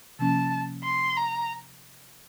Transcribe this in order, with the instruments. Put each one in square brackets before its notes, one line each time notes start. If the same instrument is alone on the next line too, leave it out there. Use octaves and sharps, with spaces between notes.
[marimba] C3 F3 A#3 C#4 [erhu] A5
[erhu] C6
A#5